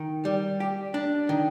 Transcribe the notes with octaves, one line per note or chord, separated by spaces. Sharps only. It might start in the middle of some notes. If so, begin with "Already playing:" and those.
Already playing: D#3
G3
G4
D4
D#3